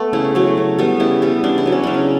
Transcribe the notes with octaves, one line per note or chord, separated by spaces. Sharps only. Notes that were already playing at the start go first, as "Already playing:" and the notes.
Already playing: A3 B3
C#3 E4
F#3 A3
C#3
G3 B3
C#3 E4
G3 B3
C#3 D4
E4
F#3 B3
C#4
C#3 D4
C#4